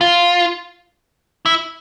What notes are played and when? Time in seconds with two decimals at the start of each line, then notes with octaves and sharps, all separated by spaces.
0.01 F4
1.46 E4